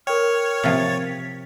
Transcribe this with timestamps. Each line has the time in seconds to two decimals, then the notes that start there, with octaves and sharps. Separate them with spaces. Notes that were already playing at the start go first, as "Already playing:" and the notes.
0.07 A#4 C#5 G5 F6
0.64 C3 F3 A6
1.06 B6